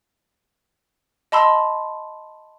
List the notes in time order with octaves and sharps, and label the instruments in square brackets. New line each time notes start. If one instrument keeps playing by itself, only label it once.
[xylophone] D#5 A5 B5 C6 E6